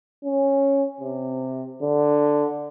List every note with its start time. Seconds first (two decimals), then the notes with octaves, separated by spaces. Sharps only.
0.24 C#4
1.01 C3
1.82 D3